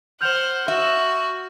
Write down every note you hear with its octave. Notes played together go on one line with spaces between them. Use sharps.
C5 F#5 F6 G6 F7
F#4 E5